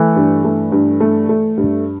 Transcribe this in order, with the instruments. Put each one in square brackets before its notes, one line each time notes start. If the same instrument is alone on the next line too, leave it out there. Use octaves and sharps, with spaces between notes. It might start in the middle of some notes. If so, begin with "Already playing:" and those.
Already playing: [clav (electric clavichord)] E3 [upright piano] A3
[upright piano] G2
A3
G2
A3
A3
G2